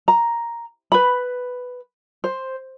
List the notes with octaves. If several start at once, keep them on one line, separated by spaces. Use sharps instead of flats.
A#5
B4 B5
C5